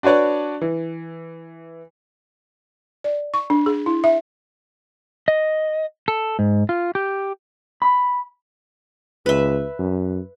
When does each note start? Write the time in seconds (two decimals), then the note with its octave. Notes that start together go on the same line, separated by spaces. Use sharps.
0.03 D4 F#4 B4 C#5 D5
0.61 E3
3.04 D5
3.34 C#6
3.50 D4
3.66 G#4
3.86 E4
4.04 E5
5.28 D#5
6.08 A4
6.39 G#2
6.69 F4
6.95 G4
7.82 B5
9.26 C#2 B4 E5
9.79 F#2